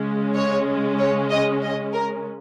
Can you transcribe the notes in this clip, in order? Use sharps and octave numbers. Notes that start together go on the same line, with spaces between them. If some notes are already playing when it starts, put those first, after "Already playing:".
Already playing: C#3 G#3 C#4
C#5
C#5
D#5
D#5
A#4